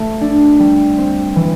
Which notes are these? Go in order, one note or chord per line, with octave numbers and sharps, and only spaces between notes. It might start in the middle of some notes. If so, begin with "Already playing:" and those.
Already playing: A3
D4
G3
C4
E3